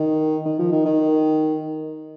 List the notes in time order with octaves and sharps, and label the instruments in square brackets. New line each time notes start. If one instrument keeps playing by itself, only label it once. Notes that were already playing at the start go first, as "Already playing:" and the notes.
Already playing: [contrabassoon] D#3
D#3
F3
D#3
D#3